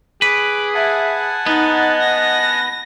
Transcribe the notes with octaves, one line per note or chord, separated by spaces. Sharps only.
G#4 B4 D6
E5 F#5 G#5 A5
B3 D#4 D#5 A6
A#6